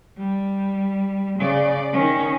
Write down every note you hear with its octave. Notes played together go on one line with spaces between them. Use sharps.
G3
C#3 D5
D#3 C#4